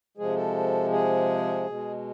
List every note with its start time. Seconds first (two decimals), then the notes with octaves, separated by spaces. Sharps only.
0.17 C3 F3 G#3 G#4
0.36 A4
0.91 G#4
1.67 B2 G#3